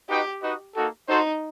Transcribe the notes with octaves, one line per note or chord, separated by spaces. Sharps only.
D#4 F#4 G4 B4 D#5 G5
D#4 F#4 B4 D#5
A#3 D#4 F#4 A4
D#4 F#4 A4 C5